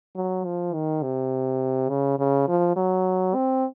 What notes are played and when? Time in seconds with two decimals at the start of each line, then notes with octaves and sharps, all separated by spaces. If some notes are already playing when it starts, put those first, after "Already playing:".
0.15 F#3
0.45 F3
0.74 D#3
1.02 C3
1.89 C#3
2.19 C#3
2.48 F3
2.76 F#3
3.35 C4